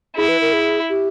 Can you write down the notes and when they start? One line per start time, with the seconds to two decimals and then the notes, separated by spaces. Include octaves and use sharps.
0.16 E4 G#4
0.28 B4
0.41 A#4
0.53 G#4
0.89 G4